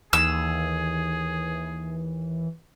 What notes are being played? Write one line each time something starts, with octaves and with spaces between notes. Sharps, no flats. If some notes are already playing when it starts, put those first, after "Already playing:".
D#2 E3 G#4 E6